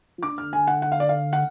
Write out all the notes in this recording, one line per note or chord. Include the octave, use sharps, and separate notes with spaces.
F3
D3 D6
F6
G#5
F#5
F#5
F5
D5
F5
F#5